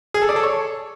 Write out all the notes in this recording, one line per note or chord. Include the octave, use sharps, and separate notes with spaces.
G#4
A4
D5
A4
C#5